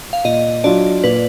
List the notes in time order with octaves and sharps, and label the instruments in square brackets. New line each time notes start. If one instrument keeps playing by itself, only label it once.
[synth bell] F5
[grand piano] A#2 [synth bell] D#5
[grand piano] F#3 D4 F4 [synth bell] D5
[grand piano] A#2 [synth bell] B4